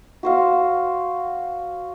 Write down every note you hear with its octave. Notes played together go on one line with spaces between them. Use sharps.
F#4 C5 F5